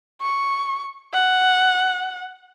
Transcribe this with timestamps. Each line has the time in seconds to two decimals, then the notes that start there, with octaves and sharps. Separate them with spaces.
0.22 C#6
1.14 F#5